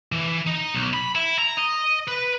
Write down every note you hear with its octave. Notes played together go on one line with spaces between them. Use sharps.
E3
D#4
B1
B5
E4
A#5
D#5
B4